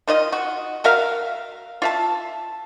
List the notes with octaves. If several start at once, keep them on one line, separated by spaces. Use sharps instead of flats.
D#3 F4 D#5
F#4
F#4 A#4 E5 F5
F4 E5 A5